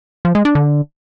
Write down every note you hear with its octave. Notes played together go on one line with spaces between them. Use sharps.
F3
G#3
D4
D3